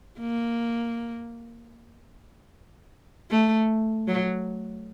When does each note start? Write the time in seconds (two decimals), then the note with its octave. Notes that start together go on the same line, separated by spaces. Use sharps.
0.20 A#3
3.30 A3
4.08 F#3